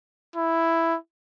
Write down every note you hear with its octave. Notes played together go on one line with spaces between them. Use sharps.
E4